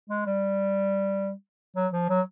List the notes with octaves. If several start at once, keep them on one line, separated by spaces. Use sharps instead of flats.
G#3
G3
F#3
F3
F#3